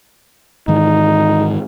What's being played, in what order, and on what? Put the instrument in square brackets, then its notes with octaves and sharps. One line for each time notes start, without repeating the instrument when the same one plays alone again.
[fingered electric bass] G#2 D#3 E3 [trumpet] D#4